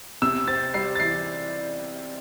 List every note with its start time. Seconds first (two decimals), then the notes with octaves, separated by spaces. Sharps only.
0.22 C3 E6
0.47 C4 A6
0.74 G3 C7
0.95 A6
1.00 E3 C7